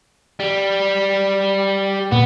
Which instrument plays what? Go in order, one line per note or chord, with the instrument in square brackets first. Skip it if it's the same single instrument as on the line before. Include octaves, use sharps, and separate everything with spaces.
[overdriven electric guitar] G3
[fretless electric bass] A#2 [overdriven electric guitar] B3